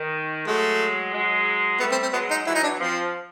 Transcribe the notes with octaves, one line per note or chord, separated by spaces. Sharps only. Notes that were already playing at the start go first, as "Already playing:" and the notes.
Already playing: D#3
F#3 G#3 A3
F#3 G#3
G3 A3 B3
C4
C4
F#3 G#3 B3
D#4
E3 F#3 E4
D#4
D4
F3 C4